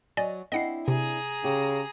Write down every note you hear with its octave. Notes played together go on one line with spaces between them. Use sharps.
F#3 D5 D#5 G#5
C4 D4 E4 D#5 F#5 C7
C3 G#4 A#5
C#3 G4